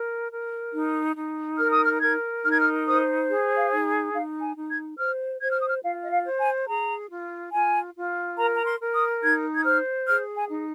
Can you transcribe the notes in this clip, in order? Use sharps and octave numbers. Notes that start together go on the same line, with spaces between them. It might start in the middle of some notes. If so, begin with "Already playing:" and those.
Already playing: A#4
A#4
D#4
D#4
A#4 F6
D#6
F6
A#4 G#6
D#4 F6
G#6
F6
C5 D#6
G#4
F5
D#4
D#4 F5
G#5
D#4
G#6
C5 F6
C5 G#6
F6
D#6
F6
F4 F5
D#5
F5
C5
G#5
G#4 A#5
F4
F4 G#5
F4
A#4 A#5
A#5
C6
A#4
D#6
D#4 G#6
G#6
C5 F6
G#4 F6
G#5
D#4